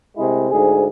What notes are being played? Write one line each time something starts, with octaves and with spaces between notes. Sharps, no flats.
C2 C3 G#3 E4
D2 G#2 G#4